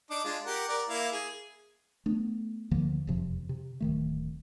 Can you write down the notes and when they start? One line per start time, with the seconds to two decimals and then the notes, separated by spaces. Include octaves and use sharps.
0.10 D4 D#4 D6
0.24 G#3 D4 F4
0.45 G4 A#4 F#5
0.68 A#4 D5
0.89 A#3 E4 F5
1.12 G#4
2.06 A3 B3 D4
2.71 D2 D3 F3 A#3
3.07 E1 F2 C3 F3
3.49 C3
3.80 D1 D#3 A3